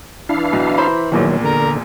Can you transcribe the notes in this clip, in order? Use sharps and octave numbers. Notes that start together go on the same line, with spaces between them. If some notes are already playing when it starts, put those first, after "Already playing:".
E3 D4 E4 F5
B1
C5 A#5 B5
A#1 E2 A#2 D#3 F#3
D3 A#4